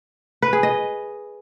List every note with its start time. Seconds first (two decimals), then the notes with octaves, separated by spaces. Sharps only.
0.42 B4
0.53 G#4
0.63 D#5